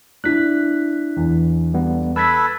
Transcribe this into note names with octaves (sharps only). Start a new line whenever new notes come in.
D4 E4 F#6 B6
E2
G3 B3
A4 B4 E6 G#6 B6